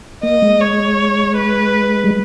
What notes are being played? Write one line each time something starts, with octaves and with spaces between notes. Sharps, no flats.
A#3 D#5
G#3
C#5
B4
G3